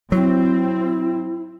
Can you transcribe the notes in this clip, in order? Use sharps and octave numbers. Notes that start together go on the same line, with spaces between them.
F#3 C4 E4